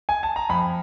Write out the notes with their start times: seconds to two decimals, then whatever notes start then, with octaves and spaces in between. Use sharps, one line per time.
0.09 G#5
0.23 A5
0.36 A#5
0.49 F2 B5